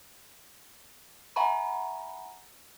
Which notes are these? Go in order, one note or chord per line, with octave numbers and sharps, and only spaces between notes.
E5 F#5 G#5 A#5 B5 C#6